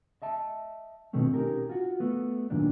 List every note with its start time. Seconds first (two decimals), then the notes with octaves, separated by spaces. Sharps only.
0.22 D#5 E5 A5
1.13 B2 D#3 A3 C4 C#4
1.34 C#4 D#4 G4 A#4
1.69 F4 F#4
2.00 A3 B3
2.50 F#2 A#2 D#3 D4